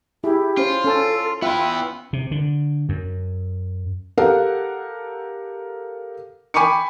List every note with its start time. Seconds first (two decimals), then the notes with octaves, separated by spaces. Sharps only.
0.24 E4 G4 G#4
0.57 C#4 F4 C5
0.85 C#4 A4 A5
1.42 B3 E4 F4 E5 G5
2.13 C3
2.31 D3
2.89 F#2
4.17 G4 A4 A#4 F5 F#5
6.54 G5 G#5 B5 C#6 D6 C#7